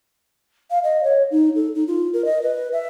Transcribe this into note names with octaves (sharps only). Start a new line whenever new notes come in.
F5
D#5
C#5
D#4
A4
D#4
F4
A#4
D#5
B4
E5